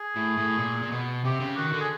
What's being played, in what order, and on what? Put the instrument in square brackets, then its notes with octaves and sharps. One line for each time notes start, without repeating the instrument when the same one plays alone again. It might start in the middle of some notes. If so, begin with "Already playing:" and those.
Already playing: [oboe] G#4
[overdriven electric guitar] A2
A2
A#2
A#2
B2
[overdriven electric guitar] C3 [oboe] G4
[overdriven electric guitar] C#3
[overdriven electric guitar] D#3 [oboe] F#4
[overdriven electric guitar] D3
[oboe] G#4